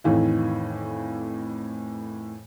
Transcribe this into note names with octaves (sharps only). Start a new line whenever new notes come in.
F2 A2 D#3 E3 F5